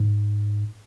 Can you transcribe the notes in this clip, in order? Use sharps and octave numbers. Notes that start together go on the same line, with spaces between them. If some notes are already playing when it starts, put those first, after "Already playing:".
Already playing: G#2